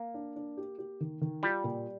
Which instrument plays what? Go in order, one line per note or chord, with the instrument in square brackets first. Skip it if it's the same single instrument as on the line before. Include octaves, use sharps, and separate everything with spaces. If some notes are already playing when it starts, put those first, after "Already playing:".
Already playing: [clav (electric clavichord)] A#3
[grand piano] D4
D4
G4
G4
D#3
D#3
[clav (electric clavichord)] G3 [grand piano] F4
[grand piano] A#2